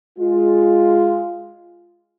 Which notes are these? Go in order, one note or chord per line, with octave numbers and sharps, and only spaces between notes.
G#3 F4